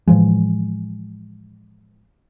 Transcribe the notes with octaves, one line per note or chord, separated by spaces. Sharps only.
A2 E3 F3 G#3